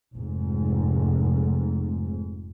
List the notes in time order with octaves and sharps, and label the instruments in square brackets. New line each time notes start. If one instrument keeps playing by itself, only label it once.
[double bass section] F1 G#2